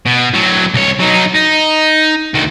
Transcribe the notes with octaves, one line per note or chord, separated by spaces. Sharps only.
B2
A2 F#3
C2 C#5
F#3 D#4
D#4
D2 D#3